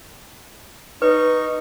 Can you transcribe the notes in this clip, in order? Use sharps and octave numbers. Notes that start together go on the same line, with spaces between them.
D#4 B4 C#6